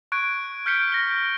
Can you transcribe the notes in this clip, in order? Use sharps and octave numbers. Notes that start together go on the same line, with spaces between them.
C#6 F#6 G#6 D7
F6 G6 B6 C#7 D7 G7
A#6 G7